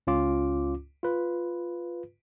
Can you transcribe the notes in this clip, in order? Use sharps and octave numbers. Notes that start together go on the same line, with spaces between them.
C#2 C#4 F4 D6
F4 B4